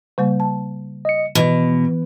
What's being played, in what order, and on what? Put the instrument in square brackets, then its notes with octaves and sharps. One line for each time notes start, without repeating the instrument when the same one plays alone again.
[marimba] C#3 G3 A#3
A5
[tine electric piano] D#5 C#7
[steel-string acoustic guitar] B2 [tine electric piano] E3